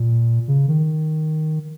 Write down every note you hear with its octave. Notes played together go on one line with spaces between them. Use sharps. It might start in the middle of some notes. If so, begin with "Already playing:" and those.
Already playing: A#2
C#3
D#3